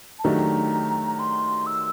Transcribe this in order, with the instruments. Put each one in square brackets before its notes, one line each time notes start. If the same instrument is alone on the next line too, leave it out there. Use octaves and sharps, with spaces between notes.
[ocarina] A5
[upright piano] D#3 F#3 A3 D4 G4 [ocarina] A#5
[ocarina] C6
E6